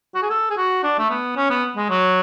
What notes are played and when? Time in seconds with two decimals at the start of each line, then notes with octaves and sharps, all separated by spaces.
0.15 F#4
0.22 G#4
0.30 A4
0.50 G#4
0.57 F#4
0.83 D4
0.98 A3
1.10 B3
1.36 C#4
1.50 B3
1.76 G#3
1.90 F#3